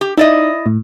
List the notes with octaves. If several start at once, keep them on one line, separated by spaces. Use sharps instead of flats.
G4
D#4 E4 D5 D#5
A2